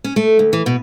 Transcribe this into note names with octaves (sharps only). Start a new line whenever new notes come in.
C#4
A3
D2
E3
B2